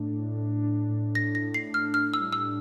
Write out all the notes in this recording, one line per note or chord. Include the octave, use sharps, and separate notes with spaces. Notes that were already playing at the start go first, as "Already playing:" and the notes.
Already playing: A2 D4
A2
D4
D4
A2
A2 A#6
A#6
A2
C7
D4
F6
A2 F6
E6
G3
E6